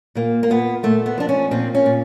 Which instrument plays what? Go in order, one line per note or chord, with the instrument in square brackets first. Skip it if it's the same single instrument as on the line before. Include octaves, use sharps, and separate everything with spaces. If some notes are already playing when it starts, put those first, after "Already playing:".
[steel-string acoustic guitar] A#2 A#3
A#3
A#2 B3
A#2 A3
B3
F3 D4
C#4
A#2 C4
C#4
A#2